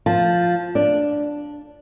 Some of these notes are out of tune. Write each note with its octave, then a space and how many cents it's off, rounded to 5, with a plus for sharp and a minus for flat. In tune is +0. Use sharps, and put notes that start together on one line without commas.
F3 +0 A5 +0
D4 +0 D5 +0